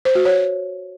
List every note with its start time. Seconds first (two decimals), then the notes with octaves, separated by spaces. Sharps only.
0.05 C5
0.15 F#4
0.25 C#5